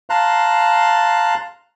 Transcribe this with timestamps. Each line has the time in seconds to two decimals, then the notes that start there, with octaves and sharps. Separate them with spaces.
0.10 F5 A5 A#5 C6 F#6